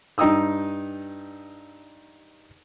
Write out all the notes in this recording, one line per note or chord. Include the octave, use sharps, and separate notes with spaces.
G2 D#4 G5 D#6 E6